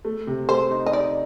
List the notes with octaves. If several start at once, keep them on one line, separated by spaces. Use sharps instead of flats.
A3
C3
A3 C5
D#4
D#5
D#4 D5